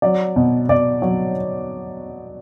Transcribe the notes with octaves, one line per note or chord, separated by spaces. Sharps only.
F#3 D5
B2
B2 D5
F#3 C#5